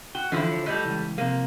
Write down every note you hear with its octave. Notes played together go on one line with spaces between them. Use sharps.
F#4 G5
D3 E3 F3 E4
C#5
A2 G3 D5 D#5
C#2 E3
C3 F3 A#3